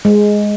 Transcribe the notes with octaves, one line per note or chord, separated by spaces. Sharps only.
G#3